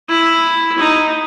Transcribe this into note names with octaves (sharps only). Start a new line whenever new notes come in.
E4
D#4